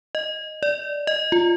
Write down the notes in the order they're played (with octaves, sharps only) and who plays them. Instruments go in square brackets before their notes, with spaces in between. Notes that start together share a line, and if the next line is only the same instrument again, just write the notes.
[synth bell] D#5
D5
D#5
F4